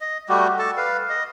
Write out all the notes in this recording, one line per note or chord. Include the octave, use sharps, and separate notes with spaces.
D#5
G3 A3 F#4 G4
A4 A5
B4 F5
D#5